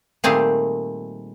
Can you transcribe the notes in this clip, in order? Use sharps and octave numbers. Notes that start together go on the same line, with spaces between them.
A#2 D#3 G3 A3 C4 G#4